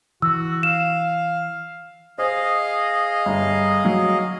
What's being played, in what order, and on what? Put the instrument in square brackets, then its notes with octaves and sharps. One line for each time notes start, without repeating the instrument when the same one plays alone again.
[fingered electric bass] E3 [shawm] F#4 [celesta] E6
[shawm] F5 [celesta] E7
[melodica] G#4 D#5 F5 [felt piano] C5
[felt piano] G1
F#3